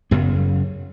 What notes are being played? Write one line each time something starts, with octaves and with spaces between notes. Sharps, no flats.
F#1 F#2 C#3 B3